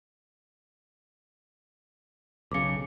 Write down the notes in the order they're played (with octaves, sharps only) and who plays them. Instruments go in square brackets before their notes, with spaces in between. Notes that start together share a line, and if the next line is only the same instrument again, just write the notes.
[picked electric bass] B1 C#3 [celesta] D6 C#7